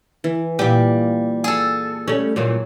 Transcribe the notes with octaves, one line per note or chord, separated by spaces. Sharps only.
E3
A#2 G3 G4
G#4 A4
G3 A3 C#4
G2 A#2 E3 F#3